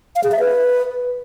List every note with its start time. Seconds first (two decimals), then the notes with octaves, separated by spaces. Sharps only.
0.16 F5
0.24 G#4
0.32 E5
0.40 B4